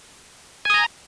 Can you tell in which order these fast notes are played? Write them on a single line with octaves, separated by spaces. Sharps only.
G#5 D#6 A#5